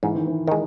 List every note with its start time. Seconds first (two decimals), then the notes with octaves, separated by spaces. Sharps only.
0.03 G#2 E3
0.15 D#3
0.27 E3
0.48 D#3 G#3